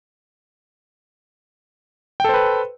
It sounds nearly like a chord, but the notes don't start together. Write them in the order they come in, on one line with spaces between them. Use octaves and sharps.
G5 A4 C5 B4